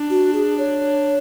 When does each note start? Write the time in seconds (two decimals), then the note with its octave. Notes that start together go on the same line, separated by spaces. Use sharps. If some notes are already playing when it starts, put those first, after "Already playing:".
Already playing: D4
0.10 F#4
0.33 G#4
0.58 C#5